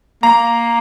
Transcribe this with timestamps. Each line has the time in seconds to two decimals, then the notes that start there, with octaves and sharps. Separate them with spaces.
0.23 A#3 A#5